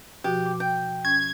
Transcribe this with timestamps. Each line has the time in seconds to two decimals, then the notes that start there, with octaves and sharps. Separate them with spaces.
0.24 B2 F3 F#4 G4
0.46 D6
0.60 G5
1.05 C#4 G#6